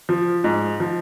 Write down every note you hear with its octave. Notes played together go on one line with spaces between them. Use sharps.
F3
G#2
F3